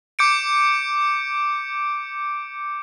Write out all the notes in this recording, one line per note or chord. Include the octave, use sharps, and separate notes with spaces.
D6 G6 C#7 D7